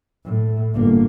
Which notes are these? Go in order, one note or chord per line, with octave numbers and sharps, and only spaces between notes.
A2
G1 A#3